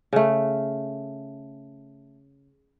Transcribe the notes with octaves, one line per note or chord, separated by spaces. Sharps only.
C#3 A3